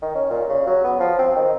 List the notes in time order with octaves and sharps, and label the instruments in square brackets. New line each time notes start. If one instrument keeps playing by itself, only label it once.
[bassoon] D#3
C#4
A#2
C#3
F#3
B3
F3
C4
D#3